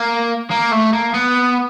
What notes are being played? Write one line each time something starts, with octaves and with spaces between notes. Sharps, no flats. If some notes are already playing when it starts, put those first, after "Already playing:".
Already playing: A#3
A#3
A3
A#3
B3